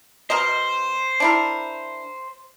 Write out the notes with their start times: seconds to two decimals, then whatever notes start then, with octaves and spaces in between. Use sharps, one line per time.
0.30 B2 A#4 C5 D#5
1.20 D4 E4 A#4